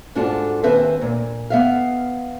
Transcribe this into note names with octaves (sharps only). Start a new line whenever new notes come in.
G#2 D4 F4 F#4 A4 A5
D#2 C4 B4 C5 E5 G#5
A#2
B3 E5 F5